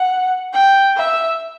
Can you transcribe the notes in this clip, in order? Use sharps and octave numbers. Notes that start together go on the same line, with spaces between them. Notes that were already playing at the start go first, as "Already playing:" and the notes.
Already playing: F#5
G5
E5